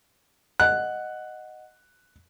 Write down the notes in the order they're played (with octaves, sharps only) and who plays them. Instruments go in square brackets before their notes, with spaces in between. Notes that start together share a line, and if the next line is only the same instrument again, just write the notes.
[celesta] D#5 F#5 [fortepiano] F#6